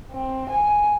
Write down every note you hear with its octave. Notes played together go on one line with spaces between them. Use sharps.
C4
G#5